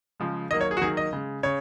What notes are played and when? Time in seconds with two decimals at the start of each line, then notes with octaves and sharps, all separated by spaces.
0.20 C#3 F3 G#3
0.51 D#3 F#3 A#3 D#5
0.61 C#5
0.71 G#4
0.77 F#4
0.81 D#3 F#3 A#3 G#4
0.97 D#5
1.13 C#3 G#3
1.43 C#3 C#5